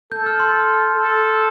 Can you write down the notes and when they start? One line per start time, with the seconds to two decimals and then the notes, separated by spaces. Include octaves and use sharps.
0.12 A4 G6
0.26 F6
0.40 C6
0.95 A4